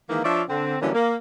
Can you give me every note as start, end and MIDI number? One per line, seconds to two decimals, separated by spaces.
0.10 0.21 51
0.10 0.21 52
0.10 0.21 56
0.10 0.21 58
0.25 0.42 53
0.25 0.42 62
0.25 0.42 65
0.25 0.42 73
0.25 0.42 74
0.25 0.42 76
0.49 0.76 50
0.49 0.76 60
0.81 0.91 50
0.81 0.91 52
0.81 0.91 54
0.81 0.91 55
0.81 0.91 58
0.81 0.91 61
0.95 1.16 58